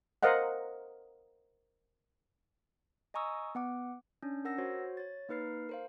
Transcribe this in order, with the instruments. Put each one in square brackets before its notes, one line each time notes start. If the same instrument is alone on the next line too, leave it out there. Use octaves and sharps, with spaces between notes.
[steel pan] A#4 C5 D#5 F5 F#5
[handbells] D#5 G#5 A#5 C#6 D#6 E6
B3 F#5 D6
C#4 D4
A#4 F#5 E6 A#6
F#4 C5 C#5
C#5 A6
A#3 D#4 B4 F6 C7
A#4 C5 F5